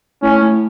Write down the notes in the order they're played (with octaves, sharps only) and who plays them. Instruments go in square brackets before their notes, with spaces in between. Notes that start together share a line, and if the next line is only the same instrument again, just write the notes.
[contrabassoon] A2 [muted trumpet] C#4
[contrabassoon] A2